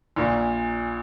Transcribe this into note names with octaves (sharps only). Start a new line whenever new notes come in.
A#1 A#2 A#3